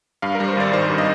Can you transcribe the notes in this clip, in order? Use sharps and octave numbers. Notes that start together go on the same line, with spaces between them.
G2 F5
A#4
G3
C5
G#1 D5
D#3 C5
G2
D#5